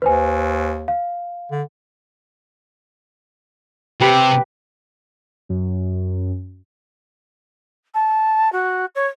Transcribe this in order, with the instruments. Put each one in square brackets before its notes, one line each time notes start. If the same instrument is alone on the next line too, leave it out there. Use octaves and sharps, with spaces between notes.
[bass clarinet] D#2 [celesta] B4 C5 G#5
[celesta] F5
[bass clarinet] D3
[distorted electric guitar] C3 [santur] G4 B4
[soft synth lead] F#2
[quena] A5
F#4
C#5